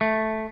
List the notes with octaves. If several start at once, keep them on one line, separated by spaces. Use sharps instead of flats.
A3